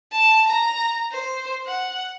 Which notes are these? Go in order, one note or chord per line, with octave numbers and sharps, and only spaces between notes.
A5
A#5
C5
F#5